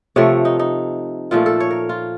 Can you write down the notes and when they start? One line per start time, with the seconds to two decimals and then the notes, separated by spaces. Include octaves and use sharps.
0.16 C3 F3 A3 C#5
0.45 D#4
0.60 D#4
1.31 A#2 F3 A3 F4
1.46 A4
1.60 C#5
1.71 A#4
1.89 F4